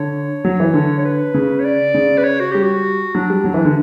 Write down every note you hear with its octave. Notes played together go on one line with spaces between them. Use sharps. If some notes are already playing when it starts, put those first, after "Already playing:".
Already playing: D3 C#5
F#3
E3
D3
C#5
B4
C#3
C#5
D5
C#3
B4
C#5
F#4
G3 G4
F#4
F#3 D4
G3
F#3
E3
D3